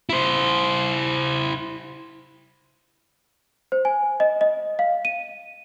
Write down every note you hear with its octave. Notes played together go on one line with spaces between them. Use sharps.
E4 C5
C5
G#5
D#5
D#5
F5
D#7